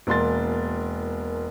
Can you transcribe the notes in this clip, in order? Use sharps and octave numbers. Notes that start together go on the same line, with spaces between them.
E1 A#3 C6 A6